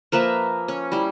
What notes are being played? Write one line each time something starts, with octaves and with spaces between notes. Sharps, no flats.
F3 A#3 B4 E5
C#4
G3 E4